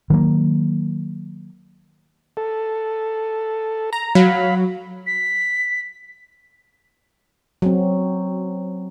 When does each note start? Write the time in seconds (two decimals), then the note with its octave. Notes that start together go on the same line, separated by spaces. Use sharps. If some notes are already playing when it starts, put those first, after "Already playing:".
0.10 D#3 F#3 A#3
2.37 A4
3.93 A#5
4.15 F#3 F5 B5
5.07 B6
7.62 F#3 C4